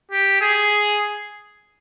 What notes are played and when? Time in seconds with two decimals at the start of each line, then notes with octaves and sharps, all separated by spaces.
0.11 G4
0.41 G#4